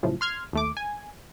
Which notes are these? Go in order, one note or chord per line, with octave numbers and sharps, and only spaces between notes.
F#2 A2 C#3 F3
C6 F6 G#6
D#2 A3 D6
G#5